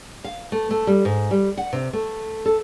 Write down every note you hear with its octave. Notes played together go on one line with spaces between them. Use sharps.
F5
A3
A3
G3
G#2
G3
F#5
C3
A3
A4